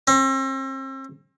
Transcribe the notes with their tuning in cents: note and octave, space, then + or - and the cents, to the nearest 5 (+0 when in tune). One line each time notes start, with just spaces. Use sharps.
C4 +40